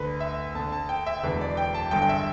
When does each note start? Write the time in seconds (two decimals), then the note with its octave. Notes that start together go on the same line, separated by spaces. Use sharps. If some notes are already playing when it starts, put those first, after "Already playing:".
Already playing: D2 D3 B4
0.20 E5
0.55 D2 D3 A5
0.72 A5
0.89 G5
1.06 E5
1.23 E1 E2 D3 B4
1.41 D5
1.57 G5
1.75 A5
1.91 G1 G2 D3 G5
2.02 G5
2.09 E5